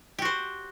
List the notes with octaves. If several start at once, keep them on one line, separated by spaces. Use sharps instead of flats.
F#4 G4 C5